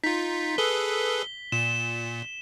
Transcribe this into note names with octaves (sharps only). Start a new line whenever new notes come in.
D#4 F4 B6
G#4 A4 B4 G7
A#2 E7